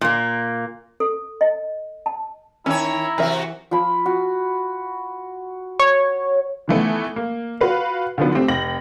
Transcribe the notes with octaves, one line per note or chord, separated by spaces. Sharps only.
A#2 A#3
A4
D#5
A5
D#3 C#4 E4 C#5 A5 A#5
C3 E3 F#4 A#4 E5
F3 B5
F#4
C#5
D#3 E3 A3 B3
A#3
F4 F#4 B4 F5
D3 D#3 F3 F#3 B3
A3 C4 G4
F1 G5 A#6 F#7